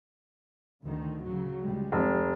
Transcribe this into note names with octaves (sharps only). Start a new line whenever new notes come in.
D2 D3 D#3
C#3 F#3
C#2 G3 G#3
F1